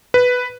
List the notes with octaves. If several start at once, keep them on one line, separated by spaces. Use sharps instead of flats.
B4